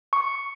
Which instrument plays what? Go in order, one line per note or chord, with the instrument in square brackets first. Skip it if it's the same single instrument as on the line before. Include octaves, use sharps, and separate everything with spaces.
[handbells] C#6